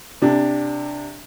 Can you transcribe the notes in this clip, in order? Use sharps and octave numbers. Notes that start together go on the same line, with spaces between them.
C3 D4 G4